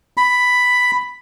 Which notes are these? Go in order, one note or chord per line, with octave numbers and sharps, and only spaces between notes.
B5